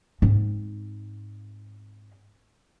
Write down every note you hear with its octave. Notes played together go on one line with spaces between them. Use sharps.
G#2 C4